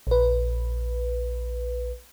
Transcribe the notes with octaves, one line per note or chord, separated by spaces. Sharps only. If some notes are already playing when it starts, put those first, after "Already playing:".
A#1 B4